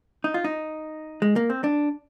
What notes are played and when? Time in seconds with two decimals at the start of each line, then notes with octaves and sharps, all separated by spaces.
0.24 D#4
0.34 F4
0.44 D#4
1.22 G#3
1.36 A#3
1.50 C4
1.64 D4